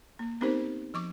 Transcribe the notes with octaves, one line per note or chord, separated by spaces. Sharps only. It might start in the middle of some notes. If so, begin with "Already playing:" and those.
A#3
B3 C4 D#4 G4 A#4 C5
F3 C#6 D6